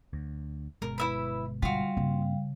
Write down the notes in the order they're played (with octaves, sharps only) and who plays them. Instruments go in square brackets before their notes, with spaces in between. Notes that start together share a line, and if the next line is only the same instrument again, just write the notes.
[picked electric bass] D2
[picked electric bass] G1 B2 G#3 [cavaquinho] A#4
[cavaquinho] E4 E5 B5 [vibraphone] B4
[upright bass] D3 [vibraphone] G3 F5 [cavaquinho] F4 F#4
[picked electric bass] G2 A#3 C4 [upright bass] C#3